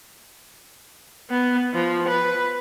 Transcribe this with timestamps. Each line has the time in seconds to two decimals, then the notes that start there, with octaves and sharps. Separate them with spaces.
1.30 B3
1.74 F3
2.08 B4